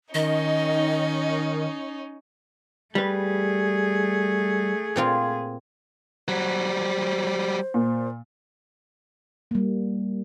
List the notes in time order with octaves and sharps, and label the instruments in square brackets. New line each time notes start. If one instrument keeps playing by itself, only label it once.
[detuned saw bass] D#3 [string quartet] C#4 D#4 [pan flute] D#5
[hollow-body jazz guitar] G3 B4 [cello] A3 G#4
[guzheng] A#2 C4 F4
[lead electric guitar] F#3 G3 [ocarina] C5
[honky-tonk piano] A#2
[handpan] G3 A#3